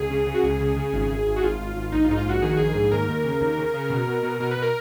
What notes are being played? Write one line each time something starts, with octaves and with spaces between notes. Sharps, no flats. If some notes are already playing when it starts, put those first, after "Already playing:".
Already playing: C#2 G#4
C#3
C#3
F#4
C#2 G#4
C#3
C#3
G#1
G#1
G#1
F#4
G#1 F4
G#1
G#1
A#1 D#4
F4
G#2 D#4
F4
A#1 F#4
D#3 G#4
F#4
A#1 G#4
G#2
D#2 A#4
D#2
C#3
D#2
C#3
C#3
B2
B2
B2
B2 A#4
B4
B2
A#4